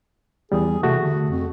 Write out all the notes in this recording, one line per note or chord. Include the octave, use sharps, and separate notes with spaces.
E2 G3 G#4
C3 A3 F#4
D3
F2